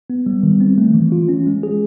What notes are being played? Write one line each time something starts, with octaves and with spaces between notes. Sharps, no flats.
B3
G3
D#3
C4
A3
E3
F4
C#4
G#3
G#4